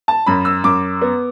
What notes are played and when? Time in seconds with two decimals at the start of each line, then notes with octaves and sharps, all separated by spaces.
0.08 A5
0.26 F#2 B5
0.45 E6
0.64 F#2 D6
1.01 B3